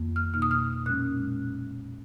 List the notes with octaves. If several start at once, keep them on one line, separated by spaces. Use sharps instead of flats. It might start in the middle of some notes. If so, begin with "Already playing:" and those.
Already playing: F2 D#3 A#3
F6
B2 A#3 D#4 F6
D#6
F6
A#2 G#3 C#4 F#6